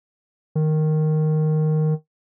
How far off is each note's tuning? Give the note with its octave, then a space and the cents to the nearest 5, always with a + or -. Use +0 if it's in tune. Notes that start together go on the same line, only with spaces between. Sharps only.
D#3 -5